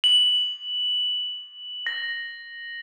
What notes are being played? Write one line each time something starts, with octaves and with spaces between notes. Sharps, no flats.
F#7
A#6